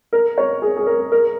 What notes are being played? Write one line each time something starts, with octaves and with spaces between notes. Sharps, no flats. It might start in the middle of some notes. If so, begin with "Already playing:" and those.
A#4
C#5
G#4
G#4
A#4
A#4